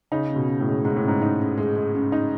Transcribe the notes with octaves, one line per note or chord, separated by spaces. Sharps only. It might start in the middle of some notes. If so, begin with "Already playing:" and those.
C#3 D#4
C#3
B2
C#3
A2
G#3
G#2 G#3
A2
C#3
G#2
D#4
C#3
G#3
G#3
C#3
D#4